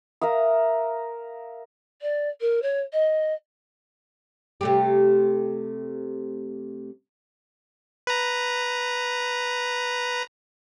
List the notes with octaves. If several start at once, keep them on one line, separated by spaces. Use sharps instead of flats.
A#4 E5 F5 D#6
D5
A#4
C#5
D#5
C3 A3 G4
B4 A#5